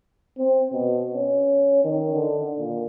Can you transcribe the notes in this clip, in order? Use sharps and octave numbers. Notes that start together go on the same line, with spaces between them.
C4
B2
C#4
D#3
D3
A#2